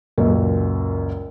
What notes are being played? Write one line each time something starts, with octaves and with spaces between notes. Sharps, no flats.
C#2 F#2 A#2